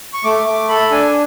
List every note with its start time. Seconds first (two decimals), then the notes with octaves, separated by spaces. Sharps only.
0.13 C#6
0.24 A3 D6
0.46 A3 D6
0.69 A4 B5
0.91 D4 G#5